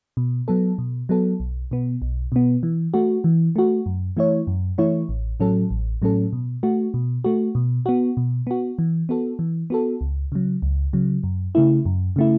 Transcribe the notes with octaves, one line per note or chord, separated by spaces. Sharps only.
B2
F#3 B3 A4
B2
F#3 B3 A4
B1
B2 B3
B1
B2 B3
E3
A3 F#4
E3
A3 F#4
F#2
E3 A3 E4 C#5
F#2
E3 A3 E4 C#5
A1
A2 F#3 C#4 A4
A1
A2 F#3 C#4 A4
B2
A3 F#4
B2
A3 F#4
B2
B3 F#4
B2
B3 F#4
E3
B3 F#4 A4
E3
B3 F#4 A4
C#2
C#3 F#3
C#2
C#3 F#3
F#2
C#3 A3 E4
F#2
C#3 A3 E4